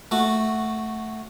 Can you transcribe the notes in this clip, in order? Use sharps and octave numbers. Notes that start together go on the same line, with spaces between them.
A3 F#4